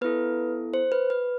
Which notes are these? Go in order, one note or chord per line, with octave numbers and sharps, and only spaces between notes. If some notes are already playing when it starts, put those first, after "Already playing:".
B3 E4 A4 B4
C5
B4
B4